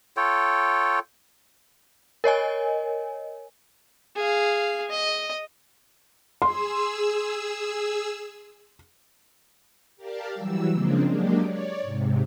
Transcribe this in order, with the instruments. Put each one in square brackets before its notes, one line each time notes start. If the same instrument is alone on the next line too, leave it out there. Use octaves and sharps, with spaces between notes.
[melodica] F4 A4 C#5 G5
[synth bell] A#4 C#5 D#5 G#5
[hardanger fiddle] G#4 F5
D#5
[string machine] G#4 E6 [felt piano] C6
[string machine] G4 A#4 D5 F5 A5
E3 F#3 G3 E6
C#3 F3 G#3 A#3 C4 D4
F#3 G#3 A#3 D4 G4
C#5 D5
G#2 C3